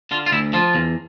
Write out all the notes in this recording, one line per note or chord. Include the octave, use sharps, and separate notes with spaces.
D3 F4
F4
D2 E4
F3 F4
E2